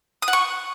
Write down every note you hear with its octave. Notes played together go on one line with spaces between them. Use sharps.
D#6
F#5
C#6